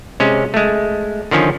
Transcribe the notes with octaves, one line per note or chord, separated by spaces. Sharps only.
C3 G#3 C#4
G#3 A3
D3 D#3 F3 C#4